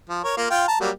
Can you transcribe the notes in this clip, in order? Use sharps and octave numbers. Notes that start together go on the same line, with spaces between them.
F3
A#4 C#5
A#3 F4
F4 G5
A5 A#5
F#3 G3 A#3